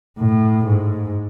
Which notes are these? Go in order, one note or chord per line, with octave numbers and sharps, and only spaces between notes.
A2
G#2